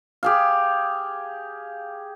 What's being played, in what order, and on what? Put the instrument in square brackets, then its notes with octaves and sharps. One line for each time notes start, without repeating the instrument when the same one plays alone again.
[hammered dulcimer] G4 G#4 F5